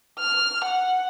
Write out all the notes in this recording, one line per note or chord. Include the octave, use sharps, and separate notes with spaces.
F6
F#5